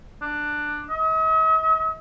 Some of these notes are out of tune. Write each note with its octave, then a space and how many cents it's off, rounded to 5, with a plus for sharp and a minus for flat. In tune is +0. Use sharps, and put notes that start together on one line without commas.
D4 +15
D#5 +45